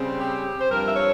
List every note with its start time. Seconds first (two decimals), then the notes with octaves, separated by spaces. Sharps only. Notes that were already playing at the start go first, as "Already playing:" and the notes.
Already playing: C#3 G3 C4
0.18 G4
0.59 C5
0.71 G2 F3 C4 A#4
0.87 E5
0.96 C#5